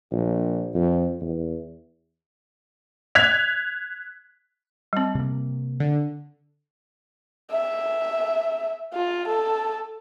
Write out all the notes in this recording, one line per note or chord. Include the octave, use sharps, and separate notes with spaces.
A#1
F2
E2
F#6 G#6 B6 F7
G3 C4
C3 A#3
D3
E5
F4
A4